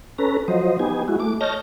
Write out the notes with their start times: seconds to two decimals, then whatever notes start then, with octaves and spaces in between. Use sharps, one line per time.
0.18 C#4 A4 B4 A#5
0.48 F3 F#3 C5 D#5
0.80 B3 D#4 G4 G#5
1.08 G#3 E4 F#4
1.20 A3 D6
1.41 C#5 D#5 A5 F6 G6 A#6